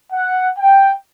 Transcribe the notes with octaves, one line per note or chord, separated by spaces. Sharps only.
F#5
G5